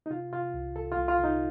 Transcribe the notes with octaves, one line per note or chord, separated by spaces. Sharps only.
D#4
C3 F4
C3 F4
C2
C2 A4
F4
C2
F4
C2 D#4